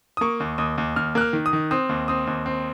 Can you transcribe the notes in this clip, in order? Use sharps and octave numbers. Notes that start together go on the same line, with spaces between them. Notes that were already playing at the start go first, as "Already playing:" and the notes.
D#6
A#3 C#6
D#2
D#2 D#6
D#2
D#2 F6
A#3 F#6
F6
D#3
D#6
D#3
C4 D#6
D#2
C4 D#6
D#2
C4